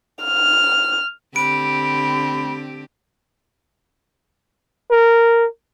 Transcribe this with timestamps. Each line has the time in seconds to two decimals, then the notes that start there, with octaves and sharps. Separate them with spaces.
0.25 F6
1.36 D3 C4 G4 B5 D7
4.91 A#4